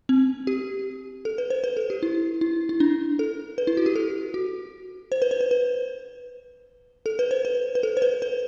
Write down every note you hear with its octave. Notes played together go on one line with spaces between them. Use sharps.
C4
G4
A4
B4
C5
B4
A4
G4
E4
E4
E4
D4
A4
B4
E4
F#4
G4
A4
F#4
C5
B4
C5
B4
B4
A4
B4
C5
B4
B4
A4
C5
B4
B4